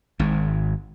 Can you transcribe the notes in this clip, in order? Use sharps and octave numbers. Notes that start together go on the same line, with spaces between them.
G#1 G#2